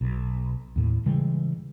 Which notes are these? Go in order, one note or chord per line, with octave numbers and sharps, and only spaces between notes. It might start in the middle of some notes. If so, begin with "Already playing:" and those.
B1
D#2 A2
C#3 E3 G3 G#3